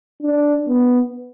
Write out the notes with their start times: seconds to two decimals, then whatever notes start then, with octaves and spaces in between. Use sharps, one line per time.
0.22 D4
0.68 B3